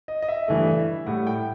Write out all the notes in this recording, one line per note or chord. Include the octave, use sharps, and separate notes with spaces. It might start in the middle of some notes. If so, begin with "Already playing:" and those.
D#5
D#5
E5
G2 E3 A3
A2 G3 F#5
G5